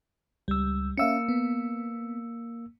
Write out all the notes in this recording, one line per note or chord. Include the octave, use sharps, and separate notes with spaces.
C#2 G3 E6
A#3 C#4 E5 F5 E6 C#7
B3